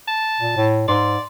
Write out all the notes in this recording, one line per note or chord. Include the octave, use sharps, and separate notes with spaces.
A5
A#2
A2
G#2 D5 C6